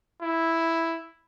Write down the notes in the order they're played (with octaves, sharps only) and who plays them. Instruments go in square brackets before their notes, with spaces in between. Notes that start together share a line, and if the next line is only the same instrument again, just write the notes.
[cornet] E4